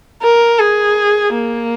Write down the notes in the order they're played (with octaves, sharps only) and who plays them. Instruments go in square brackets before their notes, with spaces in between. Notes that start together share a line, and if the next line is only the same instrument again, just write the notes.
[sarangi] A#4
G#4
A#3